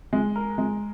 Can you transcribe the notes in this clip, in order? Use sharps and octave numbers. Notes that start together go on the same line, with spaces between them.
G#3
A#4
G#3